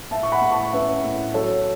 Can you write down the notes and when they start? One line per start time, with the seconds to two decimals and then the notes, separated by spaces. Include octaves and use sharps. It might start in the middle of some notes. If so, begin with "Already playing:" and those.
0.11 A2 E5 A5
0.23 C#6
0.32 F#5 B5
0.41 A2
0.52 A5 C#6
0.72 C#4 B4 E5
1.04 A2
1.34 F#3 A4 C#5